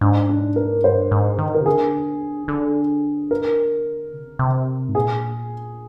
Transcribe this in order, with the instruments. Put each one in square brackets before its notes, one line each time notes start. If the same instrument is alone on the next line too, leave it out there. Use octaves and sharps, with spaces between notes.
[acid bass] G#2 [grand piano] D4
[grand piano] D4
A#4
[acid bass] G2 [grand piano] C5
[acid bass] G#2
D#3
[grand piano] A#4
[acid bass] C3
[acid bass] D3 [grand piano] G#4
[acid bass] D3
[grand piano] A#4
[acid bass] C3
D3
C3
G#2
[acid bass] A#2 [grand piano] G#4